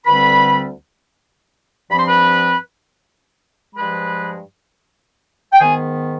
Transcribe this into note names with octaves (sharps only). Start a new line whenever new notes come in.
D2 D3 G3 C4 B4 B5
G2 F3 C4 B5
C6
B4 B5
G2 F3 G#3 B4 B5
G5
G#2 D#3 B3 G#4 G#5